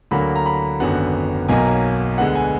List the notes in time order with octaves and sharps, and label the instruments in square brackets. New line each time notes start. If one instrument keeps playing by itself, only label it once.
[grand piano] D2 D3 F#3 A#3 B5
A#5
B5
G#1 F#2 D3 F#3 B3 F#5
B1 B2 F#3 A#3 G#5
A#5
G#5
D2 D3 G#3 B3 F#5
G#5